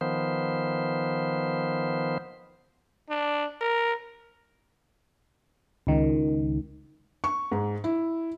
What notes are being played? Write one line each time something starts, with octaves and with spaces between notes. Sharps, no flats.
D#3 F3 B3 C5
D4
A#4
C#2 D#3
C#6
G#2
E4